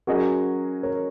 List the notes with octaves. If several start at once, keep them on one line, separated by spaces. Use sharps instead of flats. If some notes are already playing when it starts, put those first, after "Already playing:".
F#3 C#4 F#4 G#4 A#4 D#5
A#4 C#5